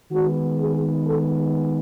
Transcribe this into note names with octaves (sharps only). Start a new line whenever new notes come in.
D#3 G#3 B3 F#4
G#4
A4